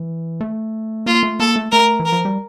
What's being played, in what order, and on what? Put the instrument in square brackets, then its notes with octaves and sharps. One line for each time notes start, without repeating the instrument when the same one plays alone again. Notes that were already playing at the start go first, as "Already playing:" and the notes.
Already playing: [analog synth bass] E3
A3
[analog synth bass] A#3 [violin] F4
[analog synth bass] A3
[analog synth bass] A#3 [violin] A4
[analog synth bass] A3
[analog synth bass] A3 [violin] A#4
[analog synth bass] E3
[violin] A#4
[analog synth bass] F3
G3